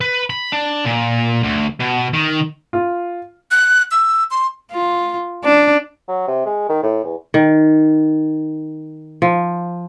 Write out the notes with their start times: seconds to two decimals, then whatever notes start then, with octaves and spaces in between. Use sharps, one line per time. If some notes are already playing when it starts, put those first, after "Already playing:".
0.01 B4
0.30 B5
0.52 D4
0.85 A#2
1.44 D2
1.80 B2
2.13 D#3
2.73 F4
3.51 F#6
3.91 E6
4.31 C6
4.71 F4
5.45 D4
6.08 F#3
6.27 C3
6.46 G#3
6.69 D#3
6.83 A2
7.04 E2
7.34 D#3
9.22 F3